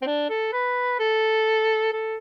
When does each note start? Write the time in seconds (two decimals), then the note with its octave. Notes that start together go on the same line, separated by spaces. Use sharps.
0.02 C4
0.06 D4
0.30 A4
0.53 B4
0.99 A4
1.92 A4